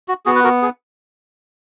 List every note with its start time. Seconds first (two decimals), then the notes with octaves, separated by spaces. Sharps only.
0.08 F#4
0.26 B3 F#4 G#4
0.35 B4
0.44 F#4 A#4
0.62 G#4